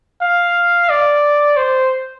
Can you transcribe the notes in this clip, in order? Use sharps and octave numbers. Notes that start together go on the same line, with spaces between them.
F5
D5
C5